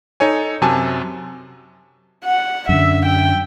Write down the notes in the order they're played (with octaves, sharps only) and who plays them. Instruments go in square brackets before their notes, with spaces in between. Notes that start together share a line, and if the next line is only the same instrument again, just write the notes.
[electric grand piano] D#4 A4 C#5 G#5
F#2 C3 F#3 G#5 A5
[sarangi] F#5
[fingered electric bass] F#2 D3 [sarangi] E5
[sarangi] G5